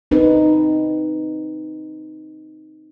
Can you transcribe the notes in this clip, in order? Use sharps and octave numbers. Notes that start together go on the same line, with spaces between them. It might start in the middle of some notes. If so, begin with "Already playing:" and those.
C4 D#4 B4